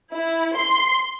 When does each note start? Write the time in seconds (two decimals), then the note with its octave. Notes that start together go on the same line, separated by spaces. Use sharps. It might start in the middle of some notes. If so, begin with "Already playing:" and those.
0.14 E4
0.56 C6